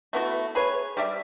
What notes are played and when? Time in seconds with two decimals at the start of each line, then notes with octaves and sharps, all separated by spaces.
0.13 A3 B3 E4 F#4
0.55 G#4 B4 C#5
0.97 G3 D5 E5